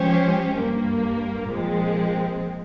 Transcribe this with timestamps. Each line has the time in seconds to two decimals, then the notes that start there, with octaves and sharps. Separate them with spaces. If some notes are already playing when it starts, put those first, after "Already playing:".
Already playing: F3 G#3 C#4 G4 C5
0.57 G2 G3 A#3
1.51 A#2 F3 G#3 C4